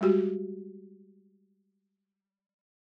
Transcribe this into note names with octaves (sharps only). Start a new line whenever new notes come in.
G3 G#3 F#4 G4